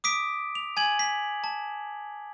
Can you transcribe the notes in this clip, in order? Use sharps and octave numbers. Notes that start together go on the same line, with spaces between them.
D6 D#6 B6 D7
F7
G#5 G#6 F#7
B6
A5